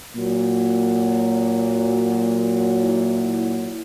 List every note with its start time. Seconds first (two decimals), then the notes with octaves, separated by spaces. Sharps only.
0.16 A#2 F#3
2.81 E4